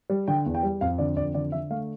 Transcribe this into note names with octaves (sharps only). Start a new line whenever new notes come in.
G3
D3 G5
E2
G5
G3
F2 F5
D3 D5
F2 D5
D3 D5
D3 E5
A3 F5